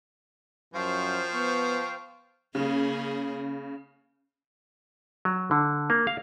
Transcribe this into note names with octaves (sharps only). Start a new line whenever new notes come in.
F#2 F3 C5 F5 G5 C#6
B3 C#6
C#3 A#3 C#4 G#4
F#3
D3
A#3
F5